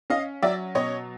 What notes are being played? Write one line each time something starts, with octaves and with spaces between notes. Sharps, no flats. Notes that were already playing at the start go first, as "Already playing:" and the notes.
C#4 D#5 F5
F#3 D5 E5
B2 C#5 D#5